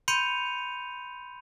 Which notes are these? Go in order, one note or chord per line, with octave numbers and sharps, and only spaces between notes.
B5 C6 G6 C#7 D#7 F7